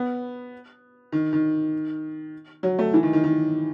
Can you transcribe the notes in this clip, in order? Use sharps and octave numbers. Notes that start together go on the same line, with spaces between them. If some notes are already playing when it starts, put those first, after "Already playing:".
Already playing: B3
D#3
D#3
F#3
A3
E3
D#3
D#3
D#3